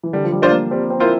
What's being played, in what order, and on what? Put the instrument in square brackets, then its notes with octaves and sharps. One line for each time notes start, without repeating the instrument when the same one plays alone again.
[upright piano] E3
[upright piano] D3 [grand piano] G3
[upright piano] F3
G3
[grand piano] D4 F4 C5
[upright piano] A#3
[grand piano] G3 [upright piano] C4
[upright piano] C4
[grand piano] A#3 F4 C5 [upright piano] E4